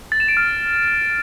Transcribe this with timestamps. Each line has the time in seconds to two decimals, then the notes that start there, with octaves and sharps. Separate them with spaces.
0.12 A6
0.20 E7
0.28 D7
0.37 F6